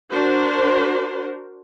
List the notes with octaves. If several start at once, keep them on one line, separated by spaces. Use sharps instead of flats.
D4 F#4 A#4 C5